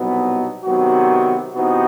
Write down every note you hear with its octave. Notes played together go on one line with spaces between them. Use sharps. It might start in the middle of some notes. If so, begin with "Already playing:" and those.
Already playing: C2 B2 F#3 B3 D#4
C3 D#3 F#3 B3 F#4
C3 E3 B3 D#4 F#4